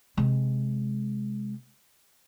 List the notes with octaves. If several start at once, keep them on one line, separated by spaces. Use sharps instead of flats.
C3 G#3